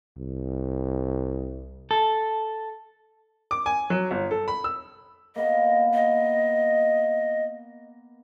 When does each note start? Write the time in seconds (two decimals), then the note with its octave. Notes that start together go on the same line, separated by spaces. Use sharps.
0.18 C2
1.91 A4
3.51 D6
3.66 G#5
3.90 F#3
4.11 G1
4.31 A4
4.48 B5
4.64 E6
5.36 A#3 B3 D#5
5.94 D#5